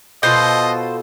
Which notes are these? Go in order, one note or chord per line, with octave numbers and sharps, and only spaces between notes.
B2 F4 A4 C5 D#5